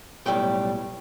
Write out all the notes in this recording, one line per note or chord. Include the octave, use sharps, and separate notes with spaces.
B1 A2 G3 G5